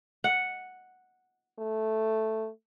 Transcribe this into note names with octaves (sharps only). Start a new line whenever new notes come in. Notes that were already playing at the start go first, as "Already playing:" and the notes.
F#5
A3